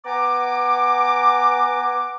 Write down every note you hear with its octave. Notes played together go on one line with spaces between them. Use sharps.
B3 F#5 G#5 A#5 D6